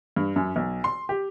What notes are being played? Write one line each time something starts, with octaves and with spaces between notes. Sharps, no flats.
G2
F#2
B1
C6
G4